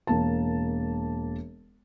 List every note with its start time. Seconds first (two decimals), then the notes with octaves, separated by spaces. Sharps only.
0.07 E1 A#3 A5